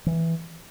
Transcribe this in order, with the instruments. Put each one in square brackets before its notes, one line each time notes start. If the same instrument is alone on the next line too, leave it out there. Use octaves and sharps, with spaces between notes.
[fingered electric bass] E3